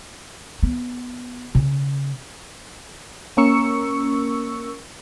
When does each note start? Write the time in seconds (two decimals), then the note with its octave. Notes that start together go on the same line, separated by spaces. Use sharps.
0.63 B3
1.55 C#3
3.37 A#3 C#4 A#4 C#6 E6 C#7